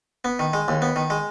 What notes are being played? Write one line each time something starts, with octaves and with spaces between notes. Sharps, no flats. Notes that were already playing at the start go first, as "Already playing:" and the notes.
B3
D#3
G#3
D#2
B3
D#3
G#3